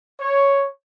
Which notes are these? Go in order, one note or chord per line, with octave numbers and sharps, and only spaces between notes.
C#5